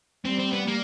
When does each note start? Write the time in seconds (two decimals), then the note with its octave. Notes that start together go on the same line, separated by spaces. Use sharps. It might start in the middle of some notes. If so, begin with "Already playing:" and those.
0.24 G3 C4
0.39 C4
0.53 B3
0.68 A#3